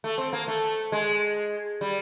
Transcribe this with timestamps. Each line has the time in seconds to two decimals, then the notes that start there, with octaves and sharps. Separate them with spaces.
0.04 A3
0.18 C4
0.33 A#3
0.48 A3
0.92 G#3
1.81 G3